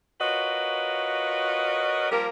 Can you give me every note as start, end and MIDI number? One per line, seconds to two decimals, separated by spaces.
0.21 2.07 65
0.21 2.07 66
0.21 2.07 70
0.21 2.07 71
0.21 2.07 73
0.21 2.07 75
2.10 2.27 53
2.10 2.27 55
2.10 2.27 58
2.10 2.27 67
2.10 2.27 70